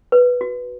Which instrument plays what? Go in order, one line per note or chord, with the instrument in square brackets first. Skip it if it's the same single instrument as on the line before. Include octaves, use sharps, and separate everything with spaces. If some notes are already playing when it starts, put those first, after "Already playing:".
[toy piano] B4
F#4